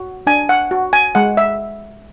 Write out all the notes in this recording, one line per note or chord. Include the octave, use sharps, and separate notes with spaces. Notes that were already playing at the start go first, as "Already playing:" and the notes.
Already playing: F#4
D4 G#5
F#5
F#4
G#5
G#3 F#5
E5